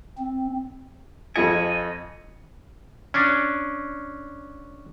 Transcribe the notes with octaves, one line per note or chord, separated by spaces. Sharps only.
C4
F2 F4 D#5 G#5 C#7
C#4 D4